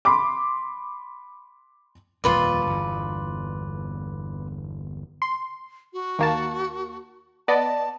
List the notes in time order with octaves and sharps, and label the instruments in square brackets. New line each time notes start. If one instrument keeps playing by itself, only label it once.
[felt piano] B5 C6 D6
[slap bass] D#1 G#1 F2 [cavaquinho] F4 B4 D5
[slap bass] G1 E2
[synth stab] C6
[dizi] F#4
[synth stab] D#2 A#3 A5
[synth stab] B3 D5 D#5 [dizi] A5